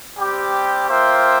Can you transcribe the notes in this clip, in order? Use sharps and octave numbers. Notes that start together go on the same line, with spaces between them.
G3 C4 G4
A#3 F4 C5 E5 G5